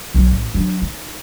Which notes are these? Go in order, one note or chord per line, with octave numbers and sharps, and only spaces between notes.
B1 F#3
A1
F#3 D4
D#4